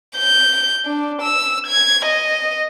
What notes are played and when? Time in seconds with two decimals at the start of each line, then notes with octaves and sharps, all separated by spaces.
0.17 G6
0.86 D4
1.22 E6
1.67 G#6
2.06 D#5